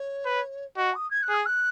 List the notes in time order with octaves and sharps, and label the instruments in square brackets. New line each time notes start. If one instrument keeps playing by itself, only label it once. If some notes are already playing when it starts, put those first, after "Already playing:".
Already playing: [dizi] C#5
[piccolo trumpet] B4
[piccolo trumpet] F#4 [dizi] D#5
[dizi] D#6
G#6
F#6
[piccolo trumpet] G#4
[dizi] D#6
F#6